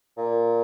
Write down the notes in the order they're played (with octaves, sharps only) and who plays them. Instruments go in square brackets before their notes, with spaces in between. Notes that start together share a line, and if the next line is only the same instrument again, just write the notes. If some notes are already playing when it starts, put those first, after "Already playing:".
[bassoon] A#2